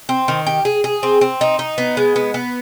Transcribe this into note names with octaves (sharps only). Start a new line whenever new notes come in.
C4
D#3
G4
G#4
G#4
C4
C4
D#4
D#4
B3
G#3
B3
B3